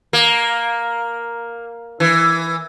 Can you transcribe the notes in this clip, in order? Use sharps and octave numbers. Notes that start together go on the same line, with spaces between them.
A#3
E3